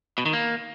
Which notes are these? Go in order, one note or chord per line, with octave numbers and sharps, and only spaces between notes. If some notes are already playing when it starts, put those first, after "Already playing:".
B2
D#3
A#3